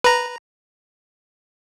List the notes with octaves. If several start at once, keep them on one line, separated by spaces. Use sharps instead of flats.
B4 A#5